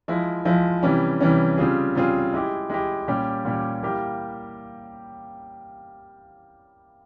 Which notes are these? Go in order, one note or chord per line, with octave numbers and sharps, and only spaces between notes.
F3 G#3 E4
F3 G#3 E4
C3 E3 G3 C#4
C3 E3 G3 C#4
C#3 G3 C4 F4 G#4
C#3 G3 C4 F4 G#4
G#3 E4 G4
G#3 E4 G4
A#2 G3 C#4 G4
A#2 G3 C#4 G4
G3 A#3 E4 G4